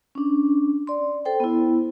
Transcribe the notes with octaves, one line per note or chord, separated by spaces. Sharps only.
C#4 D4
D5 C6
A4 C5 G5
B3 E4